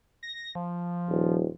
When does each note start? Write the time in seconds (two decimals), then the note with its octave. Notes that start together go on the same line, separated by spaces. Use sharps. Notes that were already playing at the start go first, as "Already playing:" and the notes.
0.23 A#6
0.55 F3
1.08 D#1